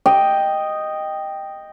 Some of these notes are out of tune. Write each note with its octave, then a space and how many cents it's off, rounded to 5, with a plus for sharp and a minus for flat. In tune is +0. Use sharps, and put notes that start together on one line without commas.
D#5 -5 G5 +0